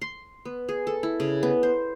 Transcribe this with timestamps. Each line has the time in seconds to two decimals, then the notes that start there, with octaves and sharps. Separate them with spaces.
0.02 C6
0.45 B3
0.69 G#4
0.87 A4
1.03 E4
1.20 C#3
1.43 B3
1.63 C5